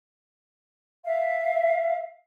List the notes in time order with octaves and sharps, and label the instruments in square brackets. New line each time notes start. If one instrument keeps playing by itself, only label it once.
[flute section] E5 F5